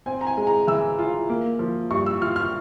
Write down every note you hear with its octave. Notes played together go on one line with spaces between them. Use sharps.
C4 G#5
A#5
G#5
G#3
A#5
E3 E6
F4
A#3
F3
G2 C#6
E6
F4 F6
F6